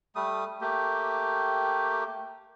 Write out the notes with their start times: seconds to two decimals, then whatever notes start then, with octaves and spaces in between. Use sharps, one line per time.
0.16 G3 A3 D#6
0.61 A3 A#3 G4